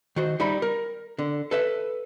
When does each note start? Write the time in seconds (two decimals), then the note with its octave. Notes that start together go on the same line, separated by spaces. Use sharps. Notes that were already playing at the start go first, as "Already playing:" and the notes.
0.16 D#3 F#4 C5
0.40 G3 D#4 E5 B5
0.62 A#4
1.19 D3
1.51 A4 B4 E5